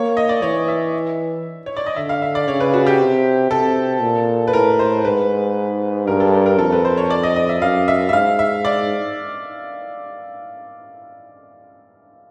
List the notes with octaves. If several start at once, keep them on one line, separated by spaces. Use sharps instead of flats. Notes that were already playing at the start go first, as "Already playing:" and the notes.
Already playing: A#3 C#5
D#5
D5
E3 C#5
E5
C#5
D5
D#5
D3 E5
F5
E5
D5
C#3 C#5
B4
F#4
G4
C3
C3 A4
A#2
B4
A2 A#4
C5
G#2 B4
G2 A#4
A4
A#4
A#4
F2 A4
B4
C5
C#5
D5
D#5
D#5
E5
F#2 F5
E5
E5
G#2 F5
E5
D5